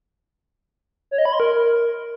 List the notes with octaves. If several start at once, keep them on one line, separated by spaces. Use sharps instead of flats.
C#5
D#5
B5
C6
A#4